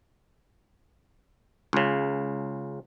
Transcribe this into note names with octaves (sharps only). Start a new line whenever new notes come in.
C#2 C#3